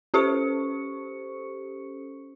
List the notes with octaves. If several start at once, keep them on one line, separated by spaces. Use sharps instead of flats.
C#4 G4 A4 C5 C#6 C#7